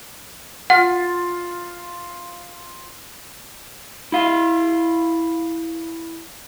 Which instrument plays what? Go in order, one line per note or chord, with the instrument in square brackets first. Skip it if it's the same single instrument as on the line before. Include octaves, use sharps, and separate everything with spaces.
[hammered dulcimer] F4 [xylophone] F#5
[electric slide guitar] E4 F5